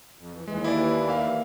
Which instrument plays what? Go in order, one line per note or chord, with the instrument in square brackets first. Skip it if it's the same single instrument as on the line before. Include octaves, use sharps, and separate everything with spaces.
[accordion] F2
E3
[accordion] D#2 E3 [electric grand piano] G#3
[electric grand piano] E4 D5
A#3 E5 F5